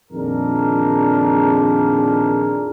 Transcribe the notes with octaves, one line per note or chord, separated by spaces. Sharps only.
F2 A#2 D#3 D4 G#4 A#4